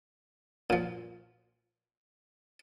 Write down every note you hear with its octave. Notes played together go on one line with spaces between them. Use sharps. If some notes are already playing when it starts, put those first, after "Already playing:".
A#2 F3